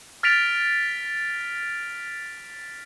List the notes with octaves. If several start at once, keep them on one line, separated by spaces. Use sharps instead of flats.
F6 A6 B6 D7 F7